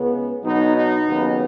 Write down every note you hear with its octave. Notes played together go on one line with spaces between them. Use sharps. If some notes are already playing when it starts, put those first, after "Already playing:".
Already playing: C#2 C#3 B3
B1 B2 F#3 B3 D#4
D#4
D#2 C#3 F#3 B3